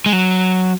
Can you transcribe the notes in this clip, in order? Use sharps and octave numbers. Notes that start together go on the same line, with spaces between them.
G#3
F#3